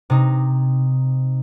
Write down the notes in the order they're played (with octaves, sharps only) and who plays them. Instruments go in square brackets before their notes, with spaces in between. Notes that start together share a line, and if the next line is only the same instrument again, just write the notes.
[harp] C3 D#4